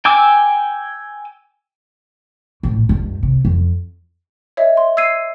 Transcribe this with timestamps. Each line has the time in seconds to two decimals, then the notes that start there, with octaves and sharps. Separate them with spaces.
0.05 G5 G#5 D6 E6
2.63 A#1 A2
2.89 C#2 G2
3.23 C3
3.45 F2
4.57 C#5 D#5 E5
4.77 C6
4.97 E6 G#6 C7 D#7